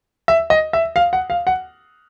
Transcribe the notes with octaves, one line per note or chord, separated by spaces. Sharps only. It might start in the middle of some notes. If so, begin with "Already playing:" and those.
E5
D#5
E5
F5
F#5
F5
F#5